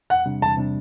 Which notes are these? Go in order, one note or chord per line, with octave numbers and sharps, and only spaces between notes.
E2 F#5
C3 G3 D4
E2 A5
C3 G3 D4